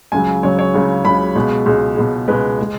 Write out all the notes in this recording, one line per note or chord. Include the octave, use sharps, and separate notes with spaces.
C#2 C#3 F#3 G#5
C#2 C#3 F#3 C#5
C#5
C#2 C#3 F#3
C#2 C#3 F#3 B5
C#2 B2 G#3
C#2 B2 G#3
C#2 B2 G#3
C#2 B2 G#3 B4
G#3